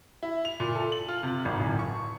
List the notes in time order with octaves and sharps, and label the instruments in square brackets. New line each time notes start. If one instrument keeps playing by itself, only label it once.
[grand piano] E4
F7
A#2
A4
F#7
F4
C3
G#1
D1
C#6